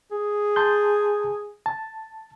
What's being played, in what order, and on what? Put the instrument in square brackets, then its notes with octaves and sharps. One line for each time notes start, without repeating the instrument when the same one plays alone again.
[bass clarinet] G#4
[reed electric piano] A5 C6 G6
A5